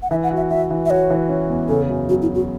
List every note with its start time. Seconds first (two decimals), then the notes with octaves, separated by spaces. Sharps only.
0.03 F#5
0.10 E3 E5
0.23 F#5
0.31 F#4
0.37 E5
0.50 F#4 E5
0.71 E3
0.86 E5
0.90 F#4 C#5
1.10 E3
1.29 C#4
1.49 E2
1.68 C#3 A4
1.89 F#2
2.09 F#3 F#4
2.22 E4
2.28 F#3
2.35 F#4